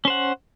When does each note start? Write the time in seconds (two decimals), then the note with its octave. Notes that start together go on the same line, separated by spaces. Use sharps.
0.05 C#4
0.08 C5
0.10 F#5